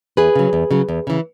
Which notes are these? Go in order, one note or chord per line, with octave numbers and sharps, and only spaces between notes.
E2 G#4 B4
C#3 F#3
E2
C#3 F#3
E2
C#3 E3